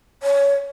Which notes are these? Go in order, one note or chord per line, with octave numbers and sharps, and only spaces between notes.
C#5